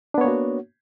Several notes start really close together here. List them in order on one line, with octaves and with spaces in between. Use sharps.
D4 B3 C#5 A#3 F#4